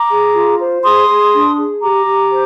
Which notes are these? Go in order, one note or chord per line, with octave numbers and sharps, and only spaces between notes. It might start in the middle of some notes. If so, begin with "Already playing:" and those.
Already playing: A#5 D6
G#4
F4
C5
G#4 C6 D#6
G#4
D4
G#4
G4 A#5 D6
G4
C5